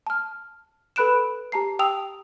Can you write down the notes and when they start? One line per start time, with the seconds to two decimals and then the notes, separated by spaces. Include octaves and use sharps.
0.07 A5 F6
0.96 A4 B4 B5 F#6 D7 E7
1.52 G4 A5 A#5 C7
1.79 G4 G5 A5 D#6 E6 F7